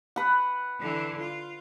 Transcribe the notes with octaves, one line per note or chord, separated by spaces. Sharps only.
B4 F#5
D3 E3
F4